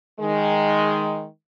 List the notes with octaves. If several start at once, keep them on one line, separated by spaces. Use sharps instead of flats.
D#3 G#3